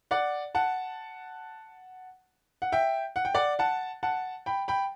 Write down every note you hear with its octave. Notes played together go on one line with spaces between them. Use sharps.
D5 F#5
F#5 A5
F#5
E5 G5
F#5
G5
D5 F#5
F#5 A5
F#5 A5
G5 B5
G5 B5